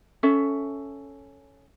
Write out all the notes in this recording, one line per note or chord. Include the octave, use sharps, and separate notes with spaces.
C#4 A4 E5